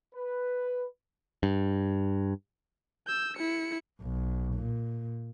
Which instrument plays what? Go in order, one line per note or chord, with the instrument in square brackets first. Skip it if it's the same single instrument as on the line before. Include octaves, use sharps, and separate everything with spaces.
[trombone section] B4
[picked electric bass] G2
[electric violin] E6 G6
E4 C#7
[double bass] B1
A#2